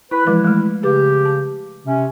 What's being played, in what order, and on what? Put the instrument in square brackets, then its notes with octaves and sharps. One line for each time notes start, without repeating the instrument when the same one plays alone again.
[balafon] E4 [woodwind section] B4
[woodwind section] E3 E4 [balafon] F3 G#3 B4
[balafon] G#3 A3
[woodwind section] C#3 G4 [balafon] G#4 B4
[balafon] A5
[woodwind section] C3 C#4